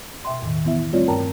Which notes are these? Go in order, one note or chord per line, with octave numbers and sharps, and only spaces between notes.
B2 E5 G5 C6
E2 A2 D#3
E3 B3 E4 E5
G3 A3 C4 F4 C#5 D5
G2 A#4 G5 A5 A#5